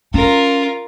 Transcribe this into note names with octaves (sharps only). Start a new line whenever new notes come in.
C#4 F4 A#4